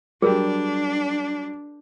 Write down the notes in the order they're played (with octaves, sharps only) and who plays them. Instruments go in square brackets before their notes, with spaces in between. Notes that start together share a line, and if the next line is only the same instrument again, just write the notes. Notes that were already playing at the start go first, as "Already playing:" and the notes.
[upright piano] F#3 G3 G4 [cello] D4 [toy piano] G#4 A#4